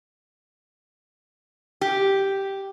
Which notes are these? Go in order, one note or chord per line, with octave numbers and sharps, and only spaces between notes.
G4